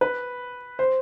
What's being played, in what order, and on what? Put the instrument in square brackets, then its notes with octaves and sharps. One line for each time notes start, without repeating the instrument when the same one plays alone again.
[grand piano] B4
C5